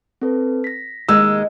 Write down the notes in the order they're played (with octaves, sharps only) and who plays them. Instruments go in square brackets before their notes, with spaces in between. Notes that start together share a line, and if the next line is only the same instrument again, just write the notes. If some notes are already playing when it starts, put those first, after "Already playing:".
[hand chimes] C4 A4 B4
A#6 B6
[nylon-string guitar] D#2 G#3 [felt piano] E6